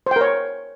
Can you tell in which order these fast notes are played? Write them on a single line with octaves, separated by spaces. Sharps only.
C5 G5 A#4 C#5